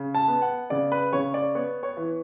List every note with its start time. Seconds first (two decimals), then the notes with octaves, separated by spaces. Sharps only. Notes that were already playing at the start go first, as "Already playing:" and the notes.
Already playing: C#3
0.15 A5
0.28 B3
0.42 F#5
0.70 C#3 D5
0.92 B4
1.13 C#3 C#5
1.34 D5
1.55 B3 C#5
1.83 C#5
1.97 E3